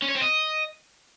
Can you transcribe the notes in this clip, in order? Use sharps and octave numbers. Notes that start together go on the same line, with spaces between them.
C#4
C#5
C4
D#5